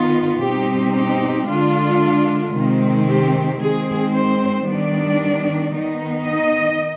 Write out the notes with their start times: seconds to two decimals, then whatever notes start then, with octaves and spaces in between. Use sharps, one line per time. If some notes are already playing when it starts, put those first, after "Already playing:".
Already playing: D#3 B3 D#4 F4
0.42 B2 G3 C4 D#4 G4
0.95 G4
1.48 D3 G#3 D4 F4
2.54 C3 D#3 G#3 C4
3.07 G4
3.60 D#3 G#3 C4 G#4
4.13 C5
4.66 D#3 G3 B3 D4 D5
5.73 D#3 B3 D#4
6.25 D#5